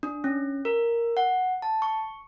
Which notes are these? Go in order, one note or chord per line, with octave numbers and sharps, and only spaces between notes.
D4
C#4
A#4
F#5
A5
C#6